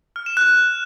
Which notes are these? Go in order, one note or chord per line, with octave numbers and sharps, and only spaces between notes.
F6
E7
F#6